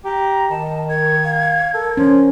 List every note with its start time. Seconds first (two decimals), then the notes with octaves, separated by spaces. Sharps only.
0.05 G4 A#5
0.50 D#3 D#5 A5
0.89 A#4 G#6
1.24 F5
1.74 A4 A#4
1.97 F3 C#4